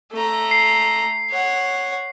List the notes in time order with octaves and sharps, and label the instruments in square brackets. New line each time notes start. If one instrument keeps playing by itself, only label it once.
[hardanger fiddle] A3 A#5
[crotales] C7
[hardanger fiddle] C#5 F#5